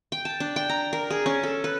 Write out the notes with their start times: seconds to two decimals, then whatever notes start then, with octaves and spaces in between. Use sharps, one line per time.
0.12 G5
0.25 A5
0.40 D4
0.56 G5
0.69 A#5
0.93 A#4
1.10 G#4
1.26 C#4
1.43 A4
1.64 B4